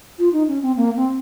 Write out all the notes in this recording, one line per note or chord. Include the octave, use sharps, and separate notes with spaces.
F4
D#4
C#4
C4
A#3
C4